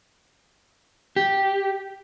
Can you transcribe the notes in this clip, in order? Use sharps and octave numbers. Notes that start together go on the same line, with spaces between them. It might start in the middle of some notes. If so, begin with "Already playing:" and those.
G4